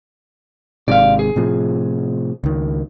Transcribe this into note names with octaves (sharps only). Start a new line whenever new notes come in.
G#1 G#2 C3 D5 F5
G#4
A2 C3 F3
C#2 D#3